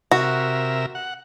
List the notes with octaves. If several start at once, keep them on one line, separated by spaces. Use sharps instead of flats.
C3 F#4 A#4 E5
F#5